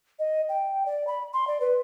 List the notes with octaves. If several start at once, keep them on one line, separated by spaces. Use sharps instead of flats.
D#5
G5
D5
B5
C6
D5
B4